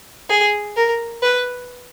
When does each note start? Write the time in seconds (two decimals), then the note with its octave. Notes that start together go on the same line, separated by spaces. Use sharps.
0.29 G#4
0.76 A#4
1.22 B4